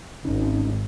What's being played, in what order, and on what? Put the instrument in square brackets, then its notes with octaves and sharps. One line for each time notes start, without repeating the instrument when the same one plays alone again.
[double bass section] G#1 [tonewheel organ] C#4 D#4